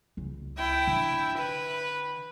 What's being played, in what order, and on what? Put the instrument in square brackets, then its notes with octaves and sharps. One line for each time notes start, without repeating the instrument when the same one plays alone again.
[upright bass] C#2 C#3
[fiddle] E4 G5
[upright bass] D3
[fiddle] B4